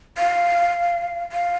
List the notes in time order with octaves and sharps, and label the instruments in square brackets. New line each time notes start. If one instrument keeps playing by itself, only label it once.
[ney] F5
F5